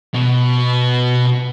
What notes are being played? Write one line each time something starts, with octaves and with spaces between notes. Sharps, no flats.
B2